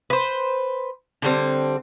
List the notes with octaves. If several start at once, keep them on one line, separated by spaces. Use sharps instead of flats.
B4 C5
D3 G3 C4